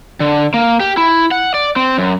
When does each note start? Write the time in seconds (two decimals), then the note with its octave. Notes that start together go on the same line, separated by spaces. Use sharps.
0.20 D3
0.54 A#3
0.80 G4
0.97 E4
1.31 F#5
1.54 D5
1.76 C4
1.98 F#2